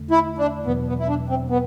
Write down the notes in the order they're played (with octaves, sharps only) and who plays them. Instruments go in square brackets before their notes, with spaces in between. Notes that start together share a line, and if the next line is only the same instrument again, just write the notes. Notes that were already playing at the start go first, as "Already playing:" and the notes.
Already playing: [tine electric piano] E2 D3 A3
[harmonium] E4
D4
[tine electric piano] E2 B2 F#3 [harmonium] B3
[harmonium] B3
E4
D4
C4
B3